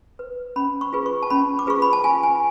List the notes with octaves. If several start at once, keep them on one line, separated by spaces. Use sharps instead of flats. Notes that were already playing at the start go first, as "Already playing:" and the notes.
B4
C#4 B5
C#6
F4 G#4 B4
C#6
A5
C#4 B5
D6
F4 G#4 B4 C#6
B5
A5
F4 G#5
G#5